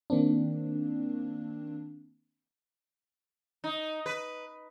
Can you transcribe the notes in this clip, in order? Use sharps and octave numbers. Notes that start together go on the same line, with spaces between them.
D#3 A#3 C4 D4
D#4
B4